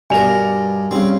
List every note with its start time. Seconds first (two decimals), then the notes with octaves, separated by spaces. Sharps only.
0.10 G2 B2 A#4 D5 G#5 F7
0.91 C#3 G3 C4 C#4